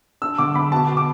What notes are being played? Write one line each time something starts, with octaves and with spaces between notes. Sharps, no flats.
D4 E6
D3 D6
D3 B5
B2 A5
B2
D6